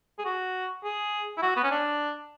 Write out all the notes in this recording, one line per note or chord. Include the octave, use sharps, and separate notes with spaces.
G#4
F#4
G#4
E4
F#4
B3
C#4
D4